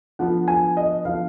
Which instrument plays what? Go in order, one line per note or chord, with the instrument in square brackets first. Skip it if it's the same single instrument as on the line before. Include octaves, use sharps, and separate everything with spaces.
[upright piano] D3 F3 B3 F4 [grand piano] F#5
[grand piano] G#5
D#5
[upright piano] D3 F3 B3 F4 [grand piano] F5